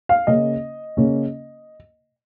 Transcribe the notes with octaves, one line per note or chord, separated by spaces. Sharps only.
F5
C#3 A#3 C#4 D#5
C#3 A#3 C#4